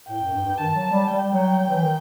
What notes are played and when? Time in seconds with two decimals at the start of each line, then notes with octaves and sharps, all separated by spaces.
0.08 A2 G5
0.21 F#2
0.33 G2
0.46 G2
0.58 D#3 A5
0.75 F#3
0.91 G3
1.08 G3 G5
1.33 F#3
1.59 F#3
1.70 E3
1.81 D#3